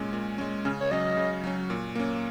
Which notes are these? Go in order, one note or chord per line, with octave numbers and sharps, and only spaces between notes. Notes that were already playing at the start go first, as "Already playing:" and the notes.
Already playing: A#2 G#3 C#4
A#2
G#3 C#4
C#3 C#4
C#5
F#3 C#4 D#5
C#3
F#3 C#4
A#2
A#3 C#4